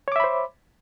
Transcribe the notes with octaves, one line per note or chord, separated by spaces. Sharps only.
C5 C#5 E5 B5 D6